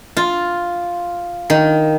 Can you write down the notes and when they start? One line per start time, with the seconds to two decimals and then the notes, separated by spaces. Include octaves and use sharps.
0.17 F4
1.50 D#3